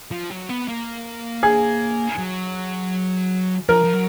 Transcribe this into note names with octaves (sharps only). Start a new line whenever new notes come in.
F3
F#3
B3
A#3
G#4
F#3
F3 A#4
F3
F#3